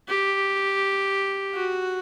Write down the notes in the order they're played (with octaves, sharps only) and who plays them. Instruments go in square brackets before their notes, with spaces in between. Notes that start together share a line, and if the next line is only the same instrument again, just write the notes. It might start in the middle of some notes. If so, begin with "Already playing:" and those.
[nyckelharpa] G4
F#4